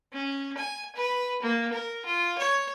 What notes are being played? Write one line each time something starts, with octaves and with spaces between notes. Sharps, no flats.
C#4
G#5
B4
A#3
A#4
F4
C#5